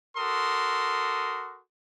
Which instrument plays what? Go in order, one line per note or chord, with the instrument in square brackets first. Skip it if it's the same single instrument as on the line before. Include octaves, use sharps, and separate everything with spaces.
[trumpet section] F#4 A4 A#4 C6 D#6